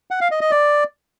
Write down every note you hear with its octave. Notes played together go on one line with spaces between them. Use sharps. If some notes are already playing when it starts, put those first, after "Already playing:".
F#5
F5
D#5
D#5
D5